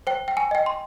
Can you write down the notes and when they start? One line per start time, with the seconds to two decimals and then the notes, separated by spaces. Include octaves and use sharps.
0.07 C5 G5
0.28 G5
0.37 G#5
0.51 D#5 G5
0.66 C6